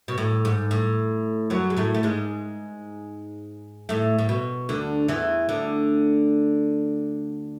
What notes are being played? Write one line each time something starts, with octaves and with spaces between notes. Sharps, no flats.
B2
A2
G#2
A2
F#2 F#3
G#3
A2 A3
A3
G#2 G#3
A2 A3
A2
B2
D2 D3
E2 E3
D2 D3